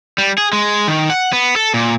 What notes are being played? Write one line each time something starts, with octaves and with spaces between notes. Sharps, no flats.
G3
G#4
G#3
D#3
F#5
B3
A4
A#2